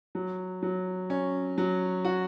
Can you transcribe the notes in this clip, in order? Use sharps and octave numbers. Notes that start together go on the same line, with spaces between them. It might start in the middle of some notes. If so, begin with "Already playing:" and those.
F#3
F#3
C#4
F#3
F#4